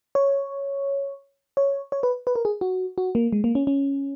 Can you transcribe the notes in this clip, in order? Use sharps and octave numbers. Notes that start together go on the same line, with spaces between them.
C#5
C#5
C#5
B4
B4
A#4
G#4
F#4
F#4
A#3
G#3
A#3
C#4
C#4